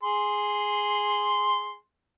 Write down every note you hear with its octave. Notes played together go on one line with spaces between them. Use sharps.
G#4 C6